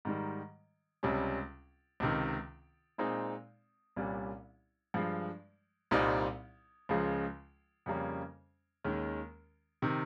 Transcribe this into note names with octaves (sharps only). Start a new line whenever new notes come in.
G#2 D#3 G3
C#2 C3 G3 C#4
C#2 C3 D#3
A#2 G#3 C4 D#4
C2 A#2 G3 C#4
G2 F3 G#3
C2 A#2 G3 C4 D#4
C#2 C#3 F3 G#3
F2 C#3 G3 A#3 C#4
D#2 D#3 G#3 C#4
C3 D#3